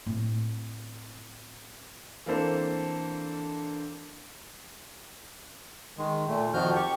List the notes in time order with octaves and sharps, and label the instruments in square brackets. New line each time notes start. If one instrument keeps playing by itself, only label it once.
[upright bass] A2 C4
[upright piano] E3 A#3 C4 D4 A4 C5
[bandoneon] D#3 G#3
A#2 A3
F2 D#3 F3 F#4 F6 G6
G4 C#6